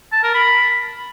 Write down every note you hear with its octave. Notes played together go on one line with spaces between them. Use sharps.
A5
A#4
B5